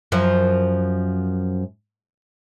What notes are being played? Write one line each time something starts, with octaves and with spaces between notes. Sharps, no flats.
F#2 F3